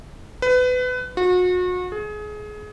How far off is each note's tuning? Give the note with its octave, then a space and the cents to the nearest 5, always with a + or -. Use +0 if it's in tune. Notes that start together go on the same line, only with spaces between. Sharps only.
B4 +25
F#4 -35
G#4 +25